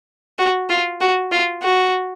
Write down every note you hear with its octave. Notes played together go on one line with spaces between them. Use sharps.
F#4
F4
F#4
F4
F#4